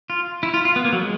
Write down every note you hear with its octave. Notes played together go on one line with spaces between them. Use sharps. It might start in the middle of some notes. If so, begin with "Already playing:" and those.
F4
E4
F4
F4
B3
A#3
F#3
G#3